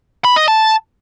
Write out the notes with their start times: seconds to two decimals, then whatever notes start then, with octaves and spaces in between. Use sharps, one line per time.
0.25 B5
0.36 D#5
0.48 A5